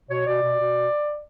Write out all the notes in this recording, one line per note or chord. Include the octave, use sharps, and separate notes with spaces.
B2 C#5
B2 D5
B2
B2